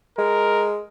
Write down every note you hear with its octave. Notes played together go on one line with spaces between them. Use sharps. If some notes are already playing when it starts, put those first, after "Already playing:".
G#3 A#4